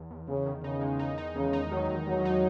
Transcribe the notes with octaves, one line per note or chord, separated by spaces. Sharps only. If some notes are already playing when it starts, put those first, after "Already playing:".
Already playing: E2
E2
E2 C#3
D#3
C#3 D#4
G#3
D#4
D#4
E2 C#3
D#4
D#3 F#3
E2
E2 F#3
D#4